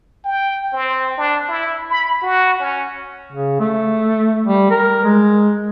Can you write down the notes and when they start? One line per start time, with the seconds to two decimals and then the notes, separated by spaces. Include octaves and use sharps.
0.25 G5
0.73 C4
1.18 D4
1.49 E4
1.90 B5
2.22 F#4
2.60 C#4
3.32 C#3
3.60 A3
4.46 G3
4.70 A#4
5.04 G#3